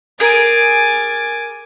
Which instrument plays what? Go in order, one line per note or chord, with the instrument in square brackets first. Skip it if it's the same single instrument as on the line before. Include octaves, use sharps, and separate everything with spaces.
[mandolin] G#4 A#4 [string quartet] G#5 D6 A6